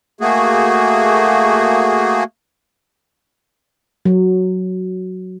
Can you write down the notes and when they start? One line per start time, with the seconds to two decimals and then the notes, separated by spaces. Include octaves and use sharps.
0.21 A3 A#3 F#4 G#4
4.05 F#3